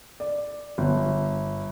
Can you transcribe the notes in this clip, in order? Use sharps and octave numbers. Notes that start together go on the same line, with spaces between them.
D5
G1